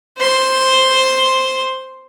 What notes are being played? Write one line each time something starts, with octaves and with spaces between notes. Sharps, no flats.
C5 C6